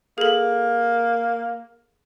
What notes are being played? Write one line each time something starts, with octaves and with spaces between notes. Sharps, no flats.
A#3 G#4 A4